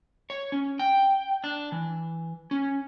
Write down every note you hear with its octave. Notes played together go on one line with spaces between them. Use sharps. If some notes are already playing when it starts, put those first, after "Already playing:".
C#5
C#4
G5
D4
E3
C#4